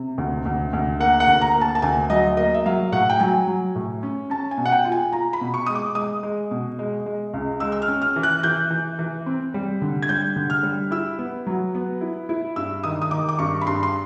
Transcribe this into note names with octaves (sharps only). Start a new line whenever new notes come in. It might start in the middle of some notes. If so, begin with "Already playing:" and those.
Already playing: C3
D2
D2
D2
A#3 F#5
F#5
D2
A#5
A#3
A5
A5
D2 G#5
F#3 D#5
A#3 D#5
E5
F#3 F5
A2 F#5
G5
F#3 G#5
F#3
A2
C#4
C#4 A5
G#5
B2
F#5
G5
F4
G#5
F4 A#5
B5
B2
C#6
G#3 D#6
D6
G#3 D#6
G#3
B2
G#3
G#3
C#2
G#3 E6
E6
F6
C#4
F6
E3
F#6
E3 G6
E3
E3
C4
G3
D3
G#6
G3 G6
D3
F6
G3
E4 E6
B3
F#3
B3
E4
E4
G2 E6
D#3 D#6
D#6
D#3 D6
D6
G2 C#6
B5
G2 C6
C6